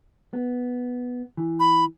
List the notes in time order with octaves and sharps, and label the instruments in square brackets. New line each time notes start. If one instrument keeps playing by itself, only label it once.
[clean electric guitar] B3
E3
[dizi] B5